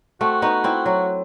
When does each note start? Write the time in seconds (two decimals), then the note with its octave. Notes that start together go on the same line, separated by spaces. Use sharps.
0.21 A3 C4 F#4
0.42 B3 D#4
0.64 C4 E4
0.86 F#3